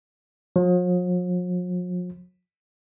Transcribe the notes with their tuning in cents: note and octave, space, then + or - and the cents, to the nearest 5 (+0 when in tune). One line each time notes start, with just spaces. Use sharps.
F3 +45